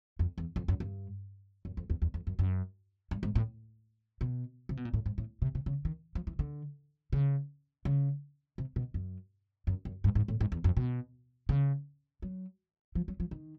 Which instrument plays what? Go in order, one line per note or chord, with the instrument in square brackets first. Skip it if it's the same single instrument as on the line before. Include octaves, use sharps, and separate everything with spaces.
[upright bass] F2
E2
F2
F#2
G2
F#2
F2
E2
E2
F2
F#2
F#2
G2
G#2
A2
B2
C3
B2
A#2
A2
G#2
A2
C3
C3
C#3
D#3
F3
E3
D3
C#3
C#3
C3
B2
F#2
F#2
F#2
G2
G#2
A2
G#2
E2
F2
B2
C#3
F#3
F3
F#3
F3
D#3